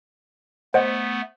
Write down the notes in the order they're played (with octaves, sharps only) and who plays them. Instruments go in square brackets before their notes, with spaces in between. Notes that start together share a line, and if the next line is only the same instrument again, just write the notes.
[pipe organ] A3 B3 [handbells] C5 D#5 F#5